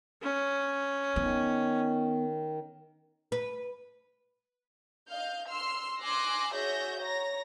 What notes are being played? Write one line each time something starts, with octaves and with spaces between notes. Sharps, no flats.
C#4
D#3 B3
B4
D#5 F5 F6 G6
C6 E6 F6 C7
G#5 C6 D6 E6 F#6 A#6
F#4 G#4 C#5 E5 G6 A#6
C#5 A#5 A#6